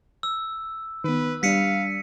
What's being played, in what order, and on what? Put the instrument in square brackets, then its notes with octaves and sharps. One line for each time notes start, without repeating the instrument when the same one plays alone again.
[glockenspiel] E6
[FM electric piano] D#3 B3 [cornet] B4
[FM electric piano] G3 D4 [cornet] F5 [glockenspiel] B6 C#7 D#7